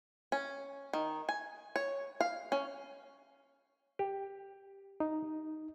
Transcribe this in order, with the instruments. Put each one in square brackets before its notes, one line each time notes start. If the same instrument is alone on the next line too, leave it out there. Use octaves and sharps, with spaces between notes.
[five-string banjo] C#4
D#3
G#5
C#5
F5
C#4
[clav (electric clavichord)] G4
[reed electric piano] D#4